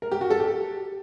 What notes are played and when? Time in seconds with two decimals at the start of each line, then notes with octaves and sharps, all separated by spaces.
0.02 A#4
0.12 G4
0.21 F#4
0.30 A4
0.40 G4